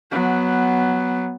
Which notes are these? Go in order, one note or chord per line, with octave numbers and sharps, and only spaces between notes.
F#3 B3